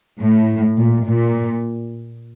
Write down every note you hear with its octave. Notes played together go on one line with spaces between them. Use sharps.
A2
A#2
A#2